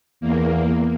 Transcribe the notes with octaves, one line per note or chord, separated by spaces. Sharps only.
E2 A#3